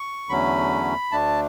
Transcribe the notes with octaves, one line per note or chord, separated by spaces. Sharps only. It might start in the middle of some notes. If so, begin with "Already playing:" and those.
Already playing: C#6
E2 D3 F#3 A3 C#4 B5
D2 D3 A3 D4 A5